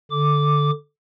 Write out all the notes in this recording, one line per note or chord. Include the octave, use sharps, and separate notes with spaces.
D3 D6